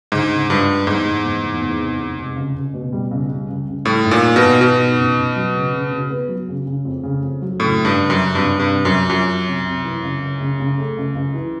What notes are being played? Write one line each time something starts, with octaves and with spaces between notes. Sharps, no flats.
D2 G#2
C#3
G2 F3
G#3
E2 G#2
E2
E2
E2
E2
F1
F1
F1
C#2
C#2
B2
G3
C#2
G3
C#2
C#2
A2 G3
G#2
A#2
D#3
B2
G#2
B2 D#3
D#3
A1
A1
F#3
C#3
C#3
C#3
B3
F#3
C#3
C#3
F2
C#3
F2
F#3
F#1 A2
F#1
G2
F#1
F#2
F#1
C2 G2
C2
G2
C2
F#2
C2
F#2 F3
F3
C2
C2
E3
C#2
C#2
C#3
C#3
A3
C#2
C#2
E3